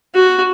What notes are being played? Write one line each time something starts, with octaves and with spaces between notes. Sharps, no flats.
F#4